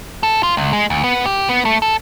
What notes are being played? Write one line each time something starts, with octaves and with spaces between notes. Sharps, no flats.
A4
F4
C#2
G#3
D2
B3
G4
B3
A3
A4